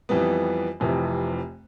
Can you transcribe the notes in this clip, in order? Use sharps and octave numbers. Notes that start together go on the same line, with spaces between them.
F2 E3 G3 B3
F1 F2 C3 E3